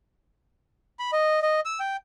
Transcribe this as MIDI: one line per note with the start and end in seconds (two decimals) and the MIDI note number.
0.99 1.11 83
1.12 1.40 75
1.42 1.60 75
1.65 1.80 88
1.80 1.97 79